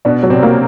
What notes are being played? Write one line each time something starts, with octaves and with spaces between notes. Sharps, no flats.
B2 B3 D4
F#3
C3 C4
A#3